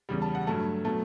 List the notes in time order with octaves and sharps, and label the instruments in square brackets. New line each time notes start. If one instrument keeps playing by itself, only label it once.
[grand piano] E2 C#3 G3
A5
F#5
G2 F#3 A3 A5
B2 F#3 A3 A5